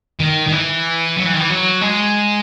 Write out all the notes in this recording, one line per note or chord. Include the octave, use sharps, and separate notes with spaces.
D#3
D#3
E3
F#3
E3
D#3
E3
F#3
G#3